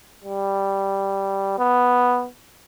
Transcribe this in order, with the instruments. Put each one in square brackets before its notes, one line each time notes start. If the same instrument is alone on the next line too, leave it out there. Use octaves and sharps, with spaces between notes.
[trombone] G3
B3